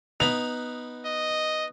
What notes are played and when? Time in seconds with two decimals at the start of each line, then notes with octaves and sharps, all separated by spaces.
0.20 B3 D#4 B5 F7
1.05 D#5